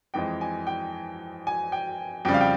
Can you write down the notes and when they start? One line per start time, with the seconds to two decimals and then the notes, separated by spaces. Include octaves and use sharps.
0.14 F2 E3 G#3 G5
0.41 G#5
0.67 G5
1.47 G#5
1.72 G5
2.25 F2 C#3 G3 G5
2.34 F5
2.41 G5